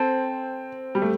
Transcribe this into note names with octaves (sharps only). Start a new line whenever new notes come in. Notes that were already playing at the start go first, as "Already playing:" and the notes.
Already playing: C4 A4 C5
G3
A3